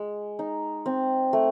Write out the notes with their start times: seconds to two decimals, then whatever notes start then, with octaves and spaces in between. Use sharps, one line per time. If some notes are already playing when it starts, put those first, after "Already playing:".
Already playing: G#3
0.39 D#4
0.86 C4
1.33 A3